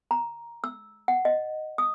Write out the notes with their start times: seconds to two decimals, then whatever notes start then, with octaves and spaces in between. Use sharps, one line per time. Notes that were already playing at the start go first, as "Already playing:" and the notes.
0.11 A#5
0.64 E6
1.08 F#5
1.25 D#5
1.78 D#6